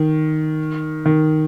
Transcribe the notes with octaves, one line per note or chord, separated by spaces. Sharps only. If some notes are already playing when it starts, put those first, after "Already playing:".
Already playing: D#3
D#3